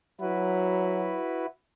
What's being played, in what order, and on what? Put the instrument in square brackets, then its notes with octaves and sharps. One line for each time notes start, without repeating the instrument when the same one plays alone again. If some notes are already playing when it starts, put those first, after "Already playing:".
[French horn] F#3 [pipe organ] E4 F#4 B4